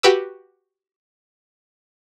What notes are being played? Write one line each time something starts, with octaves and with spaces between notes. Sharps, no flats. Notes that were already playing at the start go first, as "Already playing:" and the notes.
F#4 G4 B4 D6 E6